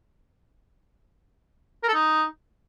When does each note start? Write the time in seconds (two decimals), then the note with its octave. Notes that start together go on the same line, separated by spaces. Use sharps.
1.83 A#4
1.89 A4
1.94 D#4